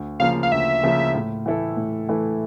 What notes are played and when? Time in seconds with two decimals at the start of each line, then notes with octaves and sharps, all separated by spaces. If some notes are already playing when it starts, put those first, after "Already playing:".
Already playing: D2
0.20 C#3 F3 A#3 F5
0.43 F5
0.51 D2 E5
0.84 C#3 F3 A#3
1.14 A2
1.46 E3 A3 E4 A4
1.77 A2
2.09 E3 A3 E4 A4